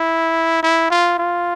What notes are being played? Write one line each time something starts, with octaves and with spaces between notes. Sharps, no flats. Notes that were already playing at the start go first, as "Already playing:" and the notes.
Already playing: E4
E4
F4
F4